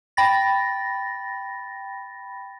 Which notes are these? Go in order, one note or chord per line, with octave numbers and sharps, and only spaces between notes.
G5 B5 A6 A#6